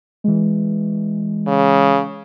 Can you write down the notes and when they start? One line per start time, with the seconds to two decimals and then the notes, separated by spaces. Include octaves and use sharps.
0.24 E3 G#3
1.48 C#3